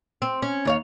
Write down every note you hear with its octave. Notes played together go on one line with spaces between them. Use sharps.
C4
C#4
D#2 C#5 F5